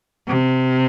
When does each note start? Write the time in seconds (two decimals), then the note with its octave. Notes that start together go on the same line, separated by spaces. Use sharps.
0.27 C3